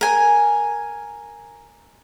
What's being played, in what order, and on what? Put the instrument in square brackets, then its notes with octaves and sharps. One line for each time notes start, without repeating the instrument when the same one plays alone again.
[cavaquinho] A#4 G#5